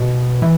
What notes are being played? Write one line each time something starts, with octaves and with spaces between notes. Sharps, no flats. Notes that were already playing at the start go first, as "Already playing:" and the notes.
Already playing: B2
E3